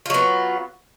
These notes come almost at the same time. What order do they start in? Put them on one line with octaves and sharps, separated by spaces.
F4 F#3 B3